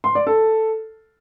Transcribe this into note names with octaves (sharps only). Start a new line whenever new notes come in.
C6
D5
A4